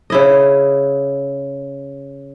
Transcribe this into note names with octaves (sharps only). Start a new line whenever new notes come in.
C#3 E4 D#5